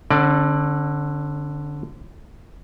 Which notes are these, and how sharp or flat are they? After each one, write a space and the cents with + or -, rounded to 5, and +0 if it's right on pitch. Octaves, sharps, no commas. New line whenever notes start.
D3 +0 C#4 -40 D5 +20